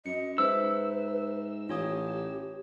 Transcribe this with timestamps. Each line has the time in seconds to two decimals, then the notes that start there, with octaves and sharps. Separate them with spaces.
0.06 F#2 D#5 C#7
0.38 G#2 B4 C5 E5 E6
1.69 A1 F4 G4 C#5 D#6